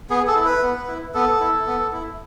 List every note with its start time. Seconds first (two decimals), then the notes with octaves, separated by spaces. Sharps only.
0.10 B3 G#4
0.27 A4
0.36 E4
0.45 B4
0.62 B3
0.88 E4
1.14 B3 A4
1.41 E4
1.66 B3
1.93 E4